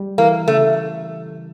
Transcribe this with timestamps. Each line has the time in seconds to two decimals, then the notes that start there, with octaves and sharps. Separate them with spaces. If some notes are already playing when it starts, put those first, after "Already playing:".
Already playing: G3
0.18 E3 A#3
0.48 C#3 A3